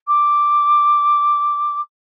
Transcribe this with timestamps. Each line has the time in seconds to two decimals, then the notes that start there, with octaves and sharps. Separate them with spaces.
0.07 D6